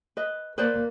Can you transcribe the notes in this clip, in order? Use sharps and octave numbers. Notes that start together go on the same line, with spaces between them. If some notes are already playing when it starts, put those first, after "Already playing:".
B4 D#5
A#3 B4 C5 D5